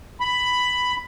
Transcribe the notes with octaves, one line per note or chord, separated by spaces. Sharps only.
B5